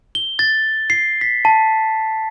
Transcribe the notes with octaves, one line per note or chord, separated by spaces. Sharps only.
G7
A6
C7
B6
A5